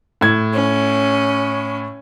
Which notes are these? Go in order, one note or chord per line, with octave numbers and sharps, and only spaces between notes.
A2 G#6
C#4